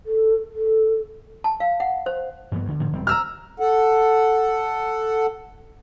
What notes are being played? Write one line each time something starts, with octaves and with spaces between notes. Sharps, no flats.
A4
A4
A5
F5
F#5
C5
G2 E3 B3
D2 D3
A2 D3 F3
E1 G3 C4
A#5 E6 F6
A4 F#5